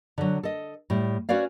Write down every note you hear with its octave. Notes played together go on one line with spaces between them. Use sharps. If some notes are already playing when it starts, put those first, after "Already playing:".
D3 F#3
A4 D#5
A2 G3
C#4 F#4 B4 C#5 D5 F5